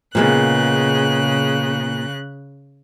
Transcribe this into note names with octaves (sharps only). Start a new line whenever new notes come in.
A#2 C#3 G#3 B3 F#6